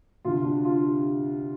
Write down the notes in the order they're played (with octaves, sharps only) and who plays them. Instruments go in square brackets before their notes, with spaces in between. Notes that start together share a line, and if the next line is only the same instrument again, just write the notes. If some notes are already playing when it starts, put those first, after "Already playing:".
[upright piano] D2 C3 F4
D4
F4
G4